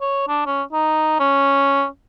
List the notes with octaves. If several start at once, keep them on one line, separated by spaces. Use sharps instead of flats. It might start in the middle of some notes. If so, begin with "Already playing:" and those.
C#5
D4
C#4
D#4
C#4